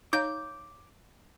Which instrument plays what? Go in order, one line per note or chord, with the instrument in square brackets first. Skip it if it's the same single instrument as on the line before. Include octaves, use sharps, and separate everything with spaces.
[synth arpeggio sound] D#4 [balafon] C#5 F5 A#5 [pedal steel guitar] D6 [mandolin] G6